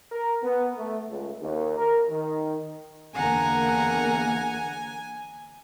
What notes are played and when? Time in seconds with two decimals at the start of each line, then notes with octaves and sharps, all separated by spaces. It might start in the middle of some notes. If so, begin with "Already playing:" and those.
0.12 A#4
0.43 B3
0.78 A3
1.09 C#2
1.41 D#2
1.77 A#4
2.09 D#3
3.15 E2 D3 A#3 F#5 G#5 A#5